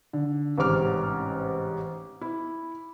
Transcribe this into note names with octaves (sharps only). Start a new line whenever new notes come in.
D3
A1 G#2 C3 D6 F6
E4